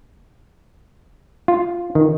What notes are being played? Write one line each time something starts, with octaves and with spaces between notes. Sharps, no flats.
F4
D#3